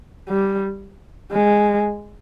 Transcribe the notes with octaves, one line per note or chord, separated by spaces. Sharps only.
G3
G#3